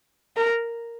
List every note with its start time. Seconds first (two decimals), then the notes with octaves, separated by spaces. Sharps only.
0.37 A#4